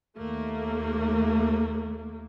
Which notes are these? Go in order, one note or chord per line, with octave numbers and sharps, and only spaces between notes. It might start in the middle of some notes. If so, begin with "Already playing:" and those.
D#2 A3 A#3